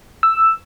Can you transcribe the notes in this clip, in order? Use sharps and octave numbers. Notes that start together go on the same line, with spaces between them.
E6